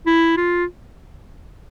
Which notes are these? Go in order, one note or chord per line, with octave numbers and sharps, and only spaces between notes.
E4
F4